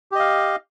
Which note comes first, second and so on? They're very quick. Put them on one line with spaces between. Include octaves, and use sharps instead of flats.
G4 D#5 F5